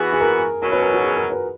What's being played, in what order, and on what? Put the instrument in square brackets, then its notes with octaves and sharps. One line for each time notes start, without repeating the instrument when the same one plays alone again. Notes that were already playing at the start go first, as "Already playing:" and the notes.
Already playing: [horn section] E3 B3 F#4 [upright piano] G#4
[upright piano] G#4
A#4
[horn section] B2 F#3 C#4 [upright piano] A#4
[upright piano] B4
A#4
F#4
G#4
A#4
B4